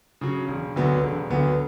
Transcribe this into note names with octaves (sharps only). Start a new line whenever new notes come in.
C#3 F#3
E1
D2 D3 F#3 B3
E1
D2 D3 F#3 B3